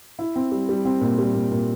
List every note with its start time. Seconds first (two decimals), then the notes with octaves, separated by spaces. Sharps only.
0.19 E4
0.36 C4
0.52 G3
0.69 G3
0.85 C4
1.01 A#2
1.19 G3
1.35 A#2
1.51 A#2